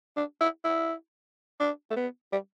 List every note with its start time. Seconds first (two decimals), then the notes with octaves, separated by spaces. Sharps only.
0.16 D4
0.40 E4
0.64 E4
1.60 D4
1.90 A3
1.96 B3
2.32 G3